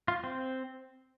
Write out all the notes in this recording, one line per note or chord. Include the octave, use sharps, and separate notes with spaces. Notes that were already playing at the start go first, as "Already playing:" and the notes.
F4
C4